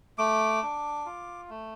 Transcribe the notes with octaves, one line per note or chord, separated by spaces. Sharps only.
A3 D6
D4
F4
A3